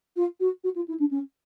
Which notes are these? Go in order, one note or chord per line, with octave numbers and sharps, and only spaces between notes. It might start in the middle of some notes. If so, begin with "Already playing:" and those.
F4
F#4
F#4
F4
E4
D4
C#4